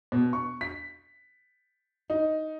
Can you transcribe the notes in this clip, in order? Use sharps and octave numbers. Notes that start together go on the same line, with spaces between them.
B2
C#6
B6
D#4